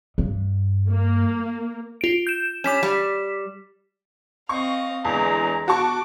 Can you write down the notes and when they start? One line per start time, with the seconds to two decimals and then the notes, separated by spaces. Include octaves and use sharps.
0.18 G2
0.89 A#3
2.01 F4 D7
2.27 G6 E7
2.64 G3 C#4 D6 B6 E7
2.83 G3
4.49 C4 D#5 F5 C#6
5.05 E2 D3 E3 G#3 A#5
5.68 B3 F#4 A5 C#6 D6